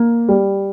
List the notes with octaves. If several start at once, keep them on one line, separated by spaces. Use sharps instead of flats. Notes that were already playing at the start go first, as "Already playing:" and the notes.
Already playing: A#3
G3